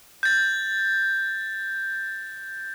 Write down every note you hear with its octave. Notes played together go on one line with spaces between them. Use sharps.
G6 A6